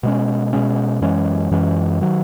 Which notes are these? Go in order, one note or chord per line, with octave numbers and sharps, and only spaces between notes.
B2 G#3 C#4
B2 G#3 C#4
F#2 E3 G#3 C#4
F#2 E3 G#3 C#4
D#3 F#3